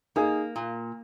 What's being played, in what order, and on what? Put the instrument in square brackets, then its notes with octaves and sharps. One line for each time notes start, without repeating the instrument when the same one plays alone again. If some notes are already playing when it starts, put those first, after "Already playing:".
[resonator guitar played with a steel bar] A#3 [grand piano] D#4 G#4
[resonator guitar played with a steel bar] A#2